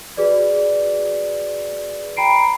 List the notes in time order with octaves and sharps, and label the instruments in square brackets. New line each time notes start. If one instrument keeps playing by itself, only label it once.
[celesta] F#4 G#4 B4 D5
G5 A#5 B5 C7 D7